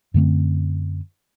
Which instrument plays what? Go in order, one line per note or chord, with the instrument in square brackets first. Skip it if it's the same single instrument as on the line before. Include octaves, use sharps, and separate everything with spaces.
[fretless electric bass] F#2 D3 A3 C4